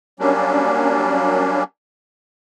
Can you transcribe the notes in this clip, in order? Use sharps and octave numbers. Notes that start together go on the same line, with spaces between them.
F#3 G3 A#3 C#4 D4